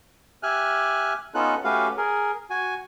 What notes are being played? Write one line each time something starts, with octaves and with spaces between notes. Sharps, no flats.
G4 E5 G#5 F6 F#6
B3 C#4 D#4 F4 A4 F#6
A3 C#4 F#4 G4 B4 F5
G#4 A#4
F#4 G#5